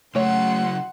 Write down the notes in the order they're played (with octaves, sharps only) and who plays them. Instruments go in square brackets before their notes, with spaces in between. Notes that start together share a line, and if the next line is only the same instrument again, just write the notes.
[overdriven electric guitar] C#3 F#3 [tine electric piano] A3 [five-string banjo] F#4 C#5 E5 [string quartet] F#5 C6